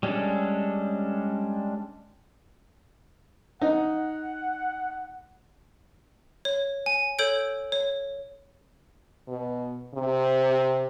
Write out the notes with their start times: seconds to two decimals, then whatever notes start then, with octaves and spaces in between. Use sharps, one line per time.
0.03 G3 G#3 C#4 D4 A4
3.62 D#4 F#5
6.45 C#5
6.86 G#5
7.19 A4 C#5 G6 D7
7.72 C#5
9.28 B2
9.94 C3